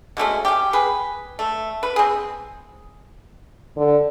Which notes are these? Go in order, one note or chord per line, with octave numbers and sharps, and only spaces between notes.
B2 G#3 A3 C#4
C#4 G4
G#4 B4
A3
B4
C4 G#4
D3